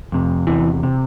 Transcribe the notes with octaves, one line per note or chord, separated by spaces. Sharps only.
F2 C3
E2 C3 E3
C3